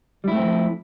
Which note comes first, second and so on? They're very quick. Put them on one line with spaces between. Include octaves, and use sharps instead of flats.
G3 E4 A3 C4 F3